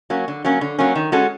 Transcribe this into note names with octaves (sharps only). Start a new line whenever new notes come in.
F#3 A#3 C#4
D3
F#3 A#3 C#4
D3
F#3 A#3 C#4
D#3
G#3 C#4 F#4 A4